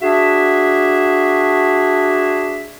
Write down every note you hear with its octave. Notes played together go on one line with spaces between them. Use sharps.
D4 F#4 G#4 E5